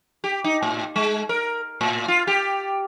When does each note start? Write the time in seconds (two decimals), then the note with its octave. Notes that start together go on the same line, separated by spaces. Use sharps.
0.24 G4
0.44 D#4
0.63 A2
0.96 G#3
1.29 A#4
1.81 A2
2.08 F4
2.27 G4